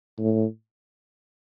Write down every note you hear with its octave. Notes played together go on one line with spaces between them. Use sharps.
A2